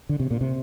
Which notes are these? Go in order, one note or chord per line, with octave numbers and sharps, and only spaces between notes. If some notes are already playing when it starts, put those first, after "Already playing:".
D3
C3
A#2
C3